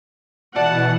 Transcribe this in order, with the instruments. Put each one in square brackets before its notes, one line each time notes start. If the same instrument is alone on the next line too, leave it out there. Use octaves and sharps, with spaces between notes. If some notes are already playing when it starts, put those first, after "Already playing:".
[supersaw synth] B2 E3 [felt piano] D5 [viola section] F#5 [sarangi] A5